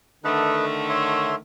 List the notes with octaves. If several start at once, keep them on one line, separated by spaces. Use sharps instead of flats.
D3 D#3 A3 A4 B4 D#5
C#5 E5 C6